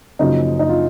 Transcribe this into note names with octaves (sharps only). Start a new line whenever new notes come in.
F#1 F#2 C#3 F3 D#4
D#4
F4